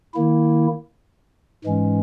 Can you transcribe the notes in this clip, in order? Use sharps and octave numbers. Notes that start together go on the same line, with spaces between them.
D#3 A#3 E4
G#2 E3 G#3 C#4